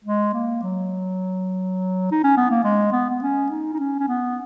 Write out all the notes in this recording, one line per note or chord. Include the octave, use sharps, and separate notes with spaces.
G#3
A#3
F#3
D#4
C#4
B3
A#3
G#3
B3
B3
C#4
D#4
D#4
C#4
C#4
B3